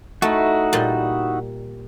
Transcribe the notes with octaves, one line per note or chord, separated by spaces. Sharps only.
A3 D#4 E4 F#4
A#2 G3